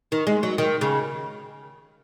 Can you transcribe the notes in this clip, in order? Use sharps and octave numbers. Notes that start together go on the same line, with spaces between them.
D#3
G#3
F#3
D#3
C#3